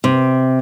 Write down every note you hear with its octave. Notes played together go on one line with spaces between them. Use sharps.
C3